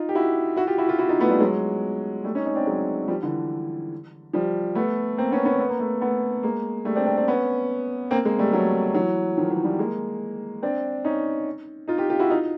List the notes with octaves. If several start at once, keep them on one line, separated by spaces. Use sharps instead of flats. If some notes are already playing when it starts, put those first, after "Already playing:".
Already playing: D#4 F4
G4
E4 F#4
E4 F#4
F4 G4
E4 F#4
F4 G4
E4 F#4
D#4 F4
A3 B3
G3 A3
F#3 G#3
G3 A3
C#4 D#4
C#4 D#4
C4 D4
F#3 G#3
F3 G3
D3 E3
F3 G3
A3 B3
A#3 C4
B3 C#4
B3 C#4
B3
A#3
A3 B3
A3 B3
G#3 A#3
G3 A3
C4 D4
C4 D4
C4 D4
B3 C#4
A#3 C4
G#3 A#3
G3 A3
F#3 G#3
E3 F#3
D#3 F3
E3 F#3
F3 G3
G#3 A#3
C4 D4
C#4 D#4
D#4 F4
F4 G4
F4 G4
E4 F#4
D#4 F4